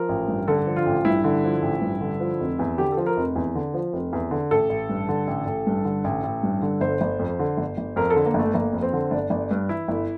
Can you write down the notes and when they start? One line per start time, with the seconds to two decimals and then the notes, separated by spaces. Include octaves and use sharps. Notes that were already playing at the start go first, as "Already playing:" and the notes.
Already playing: F3 A#4
0.09 A1
0.28 G2
0.48 D3 A4
0.66 F3
0.76 F4
0.86 A1
1.05 G2 E4
1.24 D3
1.44 F3
1.62 A1
1.81 G2
2.01 D3
2.20 F3
2.40 F1
2.59 E2
2.78 D3 G4
2.92 A4
2.97 F3
3.07 A#4
3.17 F1
3.36 E2
3.55 D3
3.74 F3
3.93 F1
4.13 E2
4.31 D3
4.51 A1 A4
4.70 A1
4.89 G2
5.09 D3
5.27 A1
5.46 A1
5.67 G2
5.85 D3
6.04 A1
6.23 A1
6.43 G2
6.62 D3
6.81 G1 C5
7.01 G1
7.19 F2
7.39 D3
7.57 G1
7.77 G1
7.96 F2 A#4
8.10 A4
8.16 D3
8.26 A#3
8.34 G1 A3
8.53 G1 A#3
8.73 F2
8.83 C4
8.93 D3
9.11 G1 D4
9.30 G1
9.51 G2
9.69 E3 E4
9.88 G1